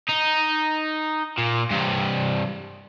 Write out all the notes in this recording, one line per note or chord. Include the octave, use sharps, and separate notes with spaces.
D#4
A#2
G2 C3